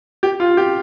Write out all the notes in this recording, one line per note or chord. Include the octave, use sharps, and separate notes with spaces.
G4
F4
G4